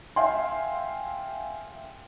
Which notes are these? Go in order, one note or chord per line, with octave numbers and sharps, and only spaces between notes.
E5 F5 G5 G#5 C6